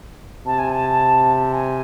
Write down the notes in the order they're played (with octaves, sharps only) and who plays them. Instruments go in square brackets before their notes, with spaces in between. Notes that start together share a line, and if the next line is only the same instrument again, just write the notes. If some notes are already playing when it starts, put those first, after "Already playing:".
[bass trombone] C3 [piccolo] A5
[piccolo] G#5
A5
G#5